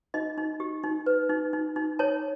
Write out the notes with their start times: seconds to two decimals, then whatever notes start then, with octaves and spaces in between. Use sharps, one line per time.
0.14 D#4 D#5
0.38 D#4
0.60 G4
0.83 D#4
1.06 B4
1.30 D#4
1.53 D#4
1.76 D#4
1.99 C#5 A5